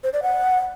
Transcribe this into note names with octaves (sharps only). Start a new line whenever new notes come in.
C5
D5
F#5